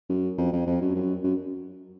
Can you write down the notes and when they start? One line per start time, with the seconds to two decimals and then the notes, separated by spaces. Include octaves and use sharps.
0.10 F#2
0.38 F2
0.53 F2
0.67 F2
0.82 F#2
0.95 F#2
1.24 F#2